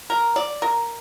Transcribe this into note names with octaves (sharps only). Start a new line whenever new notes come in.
A#4
D5
A#4